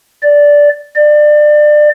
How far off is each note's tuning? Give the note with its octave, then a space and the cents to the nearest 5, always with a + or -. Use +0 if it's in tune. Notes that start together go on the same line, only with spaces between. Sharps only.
D5 -10
D5 +25